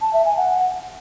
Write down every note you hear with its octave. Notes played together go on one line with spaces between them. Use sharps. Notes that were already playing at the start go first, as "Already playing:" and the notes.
A5
E5
G#5
F#5